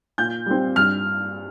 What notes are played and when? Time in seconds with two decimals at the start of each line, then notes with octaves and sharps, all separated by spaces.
0.18 A#2 G6
0.46 G3 C4
0.75 G2 F6